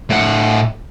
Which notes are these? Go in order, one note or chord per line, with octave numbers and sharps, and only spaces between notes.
A2 F#5